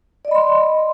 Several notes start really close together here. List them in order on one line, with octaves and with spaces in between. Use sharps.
D5 D#5 B5 C6